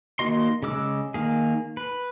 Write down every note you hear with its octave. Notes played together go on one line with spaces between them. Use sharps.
D#3 A#3 F#4 D#5 C6
C#3 G#3 D6 E6
D#3 A#3 G#4
B4